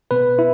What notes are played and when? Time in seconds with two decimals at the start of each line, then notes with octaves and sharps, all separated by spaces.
0.11 B2 B3 B4
0.39 E4